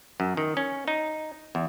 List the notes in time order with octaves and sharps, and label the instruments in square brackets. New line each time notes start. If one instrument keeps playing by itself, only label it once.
[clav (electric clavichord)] F#2
D#3
C#4
D#4
E2